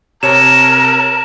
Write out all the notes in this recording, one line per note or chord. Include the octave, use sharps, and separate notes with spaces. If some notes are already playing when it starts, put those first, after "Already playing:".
C3 A#4 C#5 A5 E7